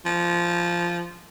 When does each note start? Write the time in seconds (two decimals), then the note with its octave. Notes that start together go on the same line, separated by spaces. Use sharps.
0.06 F3